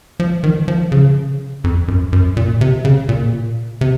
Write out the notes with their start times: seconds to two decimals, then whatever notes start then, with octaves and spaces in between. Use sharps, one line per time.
0.20 F3
0.44 D#3
0.68 F3
0.92 C#3
1.64 F2
1.88 F#2
2.13 F#2
2.37 A#2
2.61 C3
2.85 C#3
3.09 A#2
3.81 C3